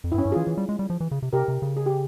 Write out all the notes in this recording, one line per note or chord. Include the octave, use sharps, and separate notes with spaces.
F2
G2 E4
C#4
G2
E3 F4 G#4
E3
G3
G#3
G3
F3
E3
C#3
C3
C3 G4 A#4
C3
C#3
G#4
G4